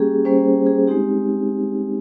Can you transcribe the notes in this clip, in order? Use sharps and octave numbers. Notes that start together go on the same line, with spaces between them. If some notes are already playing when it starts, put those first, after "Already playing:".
Already playing: G3 A#3 C#4 G4 G#4
G3 A#3 C#4 C5
G#4
G#3 C4 D#4 G4